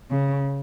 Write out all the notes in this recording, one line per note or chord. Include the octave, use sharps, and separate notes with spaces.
C#3